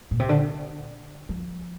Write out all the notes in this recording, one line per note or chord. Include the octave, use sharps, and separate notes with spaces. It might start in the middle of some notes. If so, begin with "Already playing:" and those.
A#2
C3
D3
F3